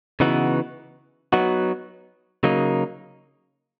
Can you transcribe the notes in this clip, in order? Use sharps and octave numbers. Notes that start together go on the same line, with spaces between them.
C#3 E3 B3 D#4 F#4
F#3 B3 D#4 F#4
C#3 F#3 A#3 D#4